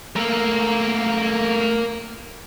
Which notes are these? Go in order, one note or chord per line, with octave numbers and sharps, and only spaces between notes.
A3 A#3 A#4 F5